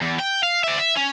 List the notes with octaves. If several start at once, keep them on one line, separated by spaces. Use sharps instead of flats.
E2
G5
F5
D5 E5
E5
C#4